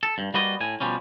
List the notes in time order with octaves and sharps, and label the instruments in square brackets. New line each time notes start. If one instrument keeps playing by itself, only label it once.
[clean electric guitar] A4
G2
G3 A#3 F#4 B4 D5 D#5
A2 G#5
B2 F3 G3 C#4